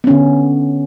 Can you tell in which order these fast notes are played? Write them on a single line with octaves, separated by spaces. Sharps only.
B3 C#4 D3